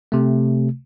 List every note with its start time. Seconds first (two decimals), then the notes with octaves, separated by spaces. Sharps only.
0.12 C3 A3